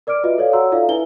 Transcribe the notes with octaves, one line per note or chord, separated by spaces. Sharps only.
A#4 D5 D6 F6 D7
F4 F#4 B4 D#5 E5
A4 C#5 D5 F5
F#4 C#5 F#5 A#5 C6 E6
D#4 F4 A4 D5 E5 F5
D4 E4 B4 E5 G#5 G7